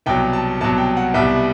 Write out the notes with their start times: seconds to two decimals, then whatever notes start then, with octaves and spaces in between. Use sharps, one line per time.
0.06 C2 B2 F#3 G5
0.33 A5
0.61 C2 B2 F#3 A5
0.78 G5
0.97 F#5
1.14 C2 B2 G3 E5